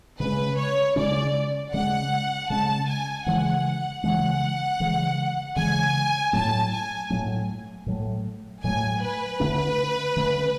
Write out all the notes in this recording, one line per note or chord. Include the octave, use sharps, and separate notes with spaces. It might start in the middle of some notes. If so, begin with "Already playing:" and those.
C#3 G#3 C#4 B4
C#5
C#3 G#3 C#4 D5
C#3 G#3 C#4 F#5
C#3 G#3 C#4 A5
G#5
C#3 E3 G#3 F#5
C#3 E3 G#3 F#5
C#3 E3 G#3
C#3 E3 G#3 G#5
A2 F#3 A3 A5
G#5
A2 F#3 A3
A2 F#3 A3
A2 F#3 A3 G#5
B4
D3 A3 C#4
D3 A3 C#4